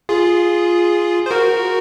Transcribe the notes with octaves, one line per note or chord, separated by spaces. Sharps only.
F4 G#4
C5
F#4 A#4